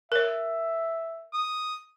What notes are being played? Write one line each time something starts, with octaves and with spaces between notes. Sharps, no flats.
A#4 C#5 E5
D#6